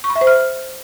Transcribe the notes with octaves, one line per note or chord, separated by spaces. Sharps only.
C#6
B5
E5
C5
F6